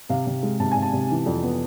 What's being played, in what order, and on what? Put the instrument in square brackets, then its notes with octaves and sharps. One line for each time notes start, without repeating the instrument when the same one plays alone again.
[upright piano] C3 F5
C3
G#3
C3 A5
C3 G#5
A5
C3
E3
F2
B3